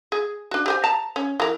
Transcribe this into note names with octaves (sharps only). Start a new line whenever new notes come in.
G#4
D4 F#4
G4 C5 G#5
A5 A#5
C#4
E3 A#4